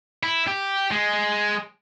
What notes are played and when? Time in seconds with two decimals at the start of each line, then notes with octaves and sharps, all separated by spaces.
0.23 E4
0.47 G4
0.91 G#3